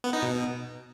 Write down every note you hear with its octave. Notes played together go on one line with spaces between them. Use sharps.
B3
D#4
B2